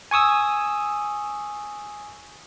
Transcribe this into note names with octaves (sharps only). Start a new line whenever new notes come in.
G#5 C#6 D#6 E6